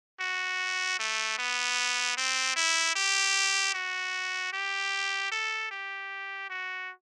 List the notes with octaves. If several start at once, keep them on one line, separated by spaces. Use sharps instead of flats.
F#4
A3
B3
C4
E4
G4
F#4
G4
A4
G4
F#4